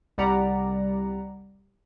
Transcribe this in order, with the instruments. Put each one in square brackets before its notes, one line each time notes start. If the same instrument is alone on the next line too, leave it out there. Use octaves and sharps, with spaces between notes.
[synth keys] C2 G3 G4 D5 F#5 A#5